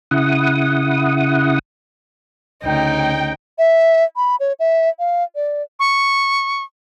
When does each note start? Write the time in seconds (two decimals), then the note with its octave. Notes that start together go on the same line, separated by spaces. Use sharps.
0.11 C#3 E4 F#5 D#6
2.63 D2 C#3 D#4 G5
3.58 E5
4.16 B5
4.40 C#5
4.59 E5
4.99 F5
5.35 D5
5.79 C#6